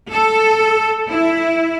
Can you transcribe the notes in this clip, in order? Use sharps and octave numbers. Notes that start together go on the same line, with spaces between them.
A4
E4